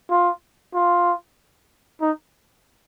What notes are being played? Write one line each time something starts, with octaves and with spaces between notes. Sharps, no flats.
F4
F4
D#4